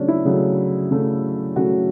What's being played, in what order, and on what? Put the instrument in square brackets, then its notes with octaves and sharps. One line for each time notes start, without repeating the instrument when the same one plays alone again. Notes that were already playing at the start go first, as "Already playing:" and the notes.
Already playing: [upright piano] C#3 F#3 A3 C#4 D4
E4
C#3 F#3 A3
C#3 F#3 A3
C#3 F#3 A3 F#4